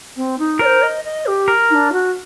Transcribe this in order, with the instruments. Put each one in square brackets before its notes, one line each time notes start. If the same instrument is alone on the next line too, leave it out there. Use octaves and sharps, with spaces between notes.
[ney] C4
D#4
[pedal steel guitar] A#4 [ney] D5
[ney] C5
D#5
D#5
G4
[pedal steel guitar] A#4
[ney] D#4
D4
F#4